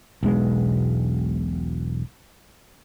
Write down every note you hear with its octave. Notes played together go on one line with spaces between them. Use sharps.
E1 B1 G#3 B3